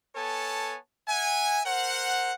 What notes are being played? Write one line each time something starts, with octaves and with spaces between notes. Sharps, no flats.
B3 A4 C#5 G#5 A5
E5 F#5 G#5
A#4 C5 F#5